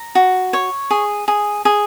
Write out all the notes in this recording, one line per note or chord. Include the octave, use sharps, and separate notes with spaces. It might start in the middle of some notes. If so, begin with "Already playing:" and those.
Already playing: A#5
F#4
C#5
G#4
G#4
G#4